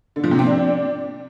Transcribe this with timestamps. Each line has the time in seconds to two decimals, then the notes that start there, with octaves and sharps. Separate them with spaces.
0.16 D3
0.24 F3
0.31 C3
0.39 C4
0.46 D4